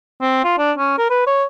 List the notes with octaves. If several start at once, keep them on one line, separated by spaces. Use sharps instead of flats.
C4
F4
D4
C#4
A#4
B4
C#5